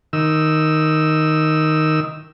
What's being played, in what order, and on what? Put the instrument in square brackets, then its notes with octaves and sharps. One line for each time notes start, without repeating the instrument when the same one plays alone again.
[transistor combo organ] D#3 E6